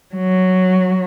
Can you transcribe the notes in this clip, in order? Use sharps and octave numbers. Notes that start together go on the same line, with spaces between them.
F#3